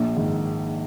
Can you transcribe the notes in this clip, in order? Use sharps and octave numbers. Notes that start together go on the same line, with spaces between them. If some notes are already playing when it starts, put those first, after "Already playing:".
Already playing: A#1
G#2 D#3